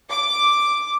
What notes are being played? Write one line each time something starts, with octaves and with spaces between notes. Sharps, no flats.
D6